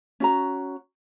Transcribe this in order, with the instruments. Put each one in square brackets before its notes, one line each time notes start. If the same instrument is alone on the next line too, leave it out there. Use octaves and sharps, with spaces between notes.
[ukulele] C#4 F#4 A#5